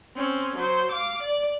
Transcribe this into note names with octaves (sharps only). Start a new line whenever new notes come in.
C4 C#4
F#3 C5
F5 D6
D5